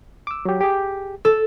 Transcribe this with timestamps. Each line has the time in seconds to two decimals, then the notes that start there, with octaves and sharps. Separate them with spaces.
0.27 D6 E6
0.45 F#3 G4
0.61 G4 G#4
1.25 A4 E6